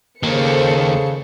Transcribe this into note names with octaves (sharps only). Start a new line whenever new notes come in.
D#2 C#3 A#3 A4 C5 C#7